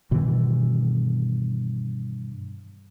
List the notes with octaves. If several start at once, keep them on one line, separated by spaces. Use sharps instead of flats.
G2 B2 D#3 E3